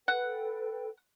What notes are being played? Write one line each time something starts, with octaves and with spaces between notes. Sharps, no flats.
A4 B4 F#5 G5